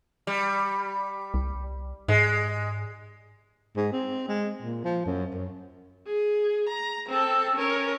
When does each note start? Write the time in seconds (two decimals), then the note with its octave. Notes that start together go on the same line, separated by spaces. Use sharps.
0.27 G3
1.34 C2
2.08 G#2 G#3
3.77 G#2
3.92 C4
4.28 G#3
4.63 A#2
4.85 F3
5.06 F#2
5.34 F#2
6.06 G#4
6.69 A#5
7.09 C4 A4
7.55 C#4 A#4